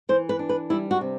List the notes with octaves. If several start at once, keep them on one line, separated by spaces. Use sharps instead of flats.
E3 C5
B4
D4
B4
G3 E4
F#4
C3